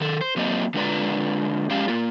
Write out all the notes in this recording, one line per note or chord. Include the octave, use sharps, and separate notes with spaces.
D#3 A4
C5
F#3 A#3 C4 D#5
D3 G#3 F4 B4 D5 A#5
G#3 C#4 G4 D5 F5
A#3 F4